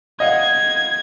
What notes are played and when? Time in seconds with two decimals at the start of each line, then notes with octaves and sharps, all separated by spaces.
0.20 D#5 F5 F#5 G#6